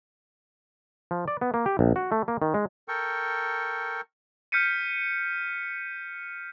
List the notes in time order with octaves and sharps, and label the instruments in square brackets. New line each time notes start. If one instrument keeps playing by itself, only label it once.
[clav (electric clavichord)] F3
D5
B3
A#3
G4
A#1
F#4
A3
A#3
D#3
G#3
[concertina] A4 A#4 G5 C#6
[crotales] F6 G6 B6 C#7 D#7